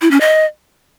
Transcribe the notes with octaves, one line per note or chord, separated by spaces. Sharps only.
E4
C#4
D#5